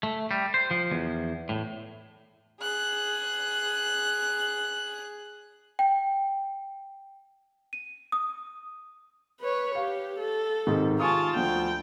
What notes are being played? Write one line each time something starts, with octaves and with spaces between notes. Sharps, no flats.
A3
G3
C5
F3
E2
A2
G#4 F#6
G5
D#7
D#6
B4 C#5
G4 F5
A4
G#2 C3 D#3
F4 G#5 A5 C#6 D#6
D2 D3 F3 G5